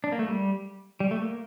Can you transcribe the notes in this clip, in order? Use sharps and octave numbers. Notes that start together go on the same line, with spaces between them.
D4
A#3
A3
G3
G3
A3
A#3